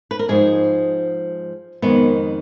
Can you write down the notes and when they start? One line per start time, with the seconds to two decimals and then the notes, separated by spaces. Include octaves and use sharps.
0.11 B4
0.19 A#4
0.29 G#2 F3 G#3 G#4
1.82 F2 D#3 G#3 B3